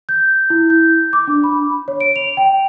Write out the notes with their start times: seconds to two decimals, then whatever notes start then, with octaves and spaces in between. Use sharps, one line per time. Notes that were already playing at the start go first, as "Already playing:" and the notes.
0.09 G6
0.50 E4
0.70 G6
1.13 D6
1.27 D4
1.44 B5
1.88 C#5
2.01 D7
2.16 F7
2.37 G5